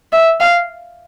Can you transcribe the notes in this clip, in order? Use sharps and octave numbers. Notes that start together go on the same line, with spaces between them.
E5
F5